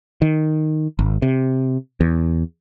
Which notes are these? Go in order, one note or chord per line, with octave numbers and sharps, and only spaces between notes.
D#3
G#1
C3
E2